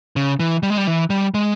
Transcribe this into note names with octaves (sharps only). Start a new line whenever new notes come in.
C#3
E3
G3
G#3
G3
E3
G3
G#3